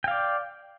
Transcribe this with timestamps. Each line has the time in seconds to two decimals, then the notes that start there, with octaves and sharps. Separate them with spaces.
0.04 G5
0.08 F5
0.11 D5